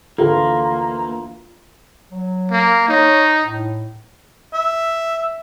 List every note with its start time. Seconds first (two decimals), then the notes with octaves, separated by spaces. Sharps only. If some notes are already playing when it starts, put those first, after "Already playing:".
0.18 D2 E3 A3 A#3 F4
2.12 F#3
2.52 A#3
2.89 D#4 C#5
3.43 A2
4.54 E5